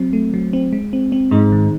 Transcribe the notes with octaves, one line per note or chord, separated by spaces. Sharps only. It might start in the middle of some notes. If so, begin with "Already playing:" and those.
Already playing: F#3 C4
A3
F#3
C4
G#3
C4
C4
G#2 D#4
D#3